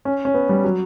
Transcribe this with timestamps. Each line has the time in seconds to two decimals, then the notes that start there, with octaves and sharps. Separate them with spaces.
0.05 C#4
0.25 C#4
0.34 B3
0.49 G3
0.64 F#3